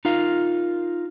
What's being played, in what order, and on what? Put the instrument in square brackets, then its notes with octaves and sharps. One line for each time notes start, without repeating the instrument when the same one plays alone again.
[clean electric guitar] D#4 F4 A#4 F5